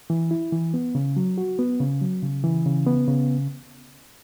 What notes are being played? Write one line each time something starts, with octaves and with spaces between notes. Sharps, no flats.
E3
E4
E3
B3
C#3
F#3
F#4
B3
C#3
F#3
C#3
E3
C#3
B3
C#3